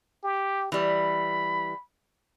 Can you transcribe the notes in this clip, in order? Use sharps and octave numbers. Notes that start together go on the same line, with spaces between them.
G4
E3 G3 B5